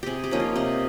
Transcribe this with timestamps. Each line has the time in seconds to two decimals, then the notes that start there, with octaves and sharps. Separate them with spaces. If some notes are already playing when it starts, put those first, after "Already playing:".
0.03 C3 G4 G#4
0.24 G4
0.31 F3 A#3 C#4 D#4
0.40 F4
0.56 C3 D#4